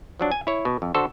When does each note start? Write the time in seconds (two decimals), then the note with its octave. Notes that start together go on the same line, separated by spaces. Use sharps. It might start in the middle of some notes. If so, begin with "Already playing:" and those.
0.20 F3 F#3 D4
0.32 G#5
0.47 E4 C#5
0.65 B2
0.82 F2
0.95 D3 F#4 A4 C5